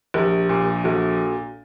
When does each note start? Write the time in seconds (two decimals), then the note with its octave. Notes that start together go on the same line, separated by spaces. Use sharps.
0.14 A#1 G4 A#4
0.49 A#2
0.84 A#1 F#4 A4